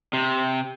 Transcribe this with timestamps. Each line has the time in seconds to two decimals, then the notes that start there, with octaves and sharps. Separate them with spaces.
0.13 C3